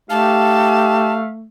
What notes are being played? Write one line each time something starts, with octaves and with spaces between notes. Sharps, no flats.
A3 D#4 G4 F5 A5